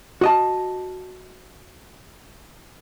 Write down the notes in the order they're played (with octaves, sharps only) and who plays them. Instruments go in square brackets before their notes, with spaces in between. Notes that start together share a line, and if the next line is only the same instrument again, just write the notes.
[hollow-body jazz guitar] F#4 D#5 A5